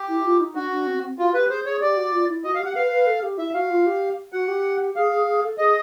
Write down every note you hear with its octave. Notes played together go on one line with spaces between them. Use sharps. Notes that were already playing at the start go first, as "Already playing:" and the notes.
Already playing: G4
E4
F4
D#4
D4 F#4
D4
C4
C4
F4 F#4
G4 B4
G#4 C5
G#4 C#5
G4 D5
F#4
F4
E4
F#4 D#5
F5
G4
F#5
B4 F5
B4
A4
G4
E4 E5
F#4 F5
F4
G4
F#4 F#5
G4
G#4 F5
G#4
G#4
A4
G#4 D#5